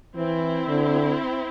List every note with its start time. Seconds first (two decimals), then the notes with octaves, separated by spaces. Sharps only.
0.15 E3 C4 E4
0.68 D3